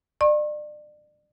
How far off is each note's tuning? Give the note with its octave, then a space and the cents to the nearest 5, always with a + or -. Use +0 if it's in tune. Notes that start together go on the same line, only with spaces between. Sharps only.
D5 +35 C#6 -45